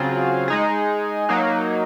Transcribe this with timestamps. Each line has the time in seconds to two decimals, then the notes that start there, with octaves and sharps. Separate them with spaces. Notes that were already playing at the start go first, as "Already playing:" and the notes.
Already playing: C#3 F#3 C4 F4 G#4
0.48 G#3 D#4 G#4
1.29 F#3 A#3 D#4